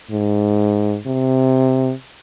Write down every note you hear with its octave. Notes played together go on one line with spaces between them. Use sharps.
G#2
C3